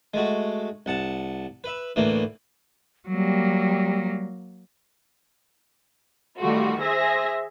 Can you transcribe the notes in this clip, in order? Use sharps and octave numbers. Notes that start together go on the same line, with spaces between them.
G#3 A3 F#4
C2 F#5 A5
B4 E5
D2 A2 E3 A#3
F#3 G3 A#3
D#3 G3 A3 F4 F#4
G#4 C5 E5 A#6